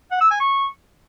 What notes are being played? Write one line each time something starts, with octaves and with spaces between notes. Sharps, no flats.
F#5
E6
G#5
C#6